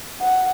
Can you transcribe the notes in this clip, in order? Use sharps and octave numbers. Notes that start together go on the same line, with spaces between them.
F#5